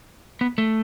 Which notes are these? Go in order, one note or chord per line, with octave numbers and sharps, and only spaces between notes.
B3
A3